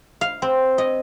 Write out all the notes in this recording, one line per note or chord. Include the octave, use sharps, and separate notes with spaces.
F5
C4
D#5